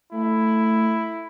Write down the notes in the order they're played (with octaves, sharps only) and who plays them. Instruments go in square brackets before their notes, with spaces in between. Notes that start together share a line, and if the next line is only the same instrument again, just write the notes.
[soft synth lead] A3 [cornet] E4